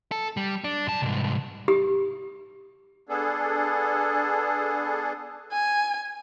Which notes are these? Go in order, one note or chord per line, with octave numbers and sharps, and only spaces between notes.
A4
G3
D4
F#2 A5
C2 G#2
G4
B3 D4 G#4 A4
G#5